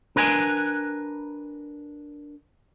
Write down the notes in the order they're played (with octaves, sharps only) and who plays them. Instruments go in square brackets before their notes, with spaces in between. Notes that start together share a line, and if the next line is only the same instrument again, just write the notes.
[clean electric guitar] D4 A#4 B4 G#5